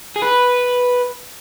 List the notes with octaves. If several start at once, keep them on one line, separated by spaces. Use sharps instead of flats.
G#4
B4